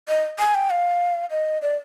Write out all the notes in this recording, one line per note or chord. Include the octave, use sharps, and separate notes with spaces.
D#5
G#5
G5
F5
D#5
D5